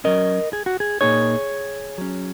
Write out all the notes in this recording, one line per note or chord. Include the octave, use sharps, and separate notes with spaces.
F#3 C#4 A#4 D#5
G#4
F#4
G#4
A#2 A#3 D#4 G#4 C#5
F#3 C#4